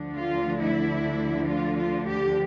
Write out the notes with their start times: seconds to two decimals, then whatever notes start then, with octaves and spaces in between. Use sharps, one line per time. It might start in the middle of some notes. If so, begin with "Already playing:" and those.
Already playing: D2 D3 F3 A3 D4
0.17 F4
0.61 E4
1.48 F4
1.78 F4
2.07 G4